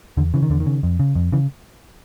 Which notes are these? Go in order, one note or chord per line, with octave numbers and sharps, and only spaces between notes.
E2 D3
C#3 E3
D#3
E2 D3
D#3
C#3
F2
C#3
F2
C#3 E3